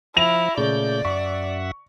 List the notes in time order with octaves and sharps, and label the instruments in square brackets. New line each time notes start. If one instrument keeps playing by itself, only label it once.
[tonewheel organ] F3 [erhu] E4 [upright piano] A#6 D7 F7
[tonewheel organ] A#2 A3 G6 [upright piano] C#3 [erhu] D5
[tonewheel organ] F#2 E5 F#5 [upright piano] C#6